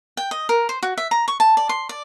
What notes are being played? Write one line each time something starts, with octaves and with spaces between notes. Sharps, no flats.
G5
D#5
A#4
C5
F#4
E5
A#5
C#6
A5
D5
C6
D5